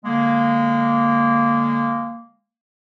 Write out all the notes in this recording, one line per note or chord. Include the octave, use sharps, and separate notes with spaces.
D3 G#3 A#3